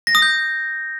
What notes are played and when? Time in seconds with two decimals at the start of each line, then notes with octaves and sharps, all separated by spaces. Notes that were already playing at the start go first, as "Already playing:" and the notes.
0.07 A#6
0.15 D#6
0.22 G6